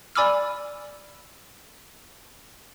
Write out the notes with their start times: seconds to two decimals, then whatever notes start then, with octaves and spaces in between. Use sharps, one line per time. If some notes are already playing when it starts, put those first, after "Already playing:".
0.15 D5 G#5 B5 D6 E6 F6